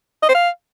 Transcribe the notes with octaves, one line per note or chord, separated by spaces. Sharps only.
D#5
C5
F5